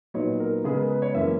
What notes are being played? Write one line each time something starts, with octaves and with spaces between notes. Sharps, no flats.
A#2 F#3 B3 D#4 C#5
A#4
C#3 G#3 B3 G#4
A#4
B4
C#5
F#2 E3 A#3 C#4 E5